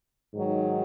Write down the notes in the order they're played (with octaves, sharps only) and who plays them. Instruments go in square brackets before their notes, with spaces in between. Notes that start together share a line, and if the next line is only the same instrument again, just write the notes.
[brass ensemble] G#2 D#3 F#3